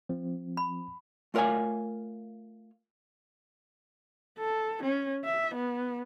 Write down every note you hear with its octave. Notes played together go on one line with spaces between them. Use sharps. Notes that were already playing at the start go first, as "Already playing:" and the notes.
F3 C4
B5
A3 F4 A#4 C#5 F5 G#5
A4
C#4
E5
B3